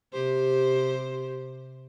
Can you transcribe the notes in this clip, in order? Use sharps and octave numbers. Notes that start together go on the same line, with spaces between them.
C3 G4 C5